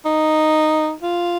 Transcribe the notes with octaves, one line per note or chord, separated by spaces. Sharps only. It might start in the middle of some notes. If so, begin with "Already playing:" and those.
D#4
F4